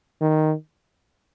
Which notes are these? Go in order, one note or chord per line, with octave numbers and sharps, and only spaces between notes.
D#3